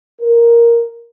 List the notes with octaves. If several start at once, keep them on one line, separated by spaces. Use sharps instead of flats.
A#4